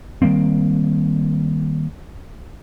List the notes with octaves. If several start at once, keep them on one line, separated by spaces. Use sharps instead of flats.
D#3 G3 A#3 C4